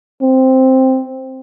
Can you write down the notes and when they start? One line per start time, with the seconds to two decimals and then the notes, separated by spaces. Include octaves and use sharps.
0.22 C4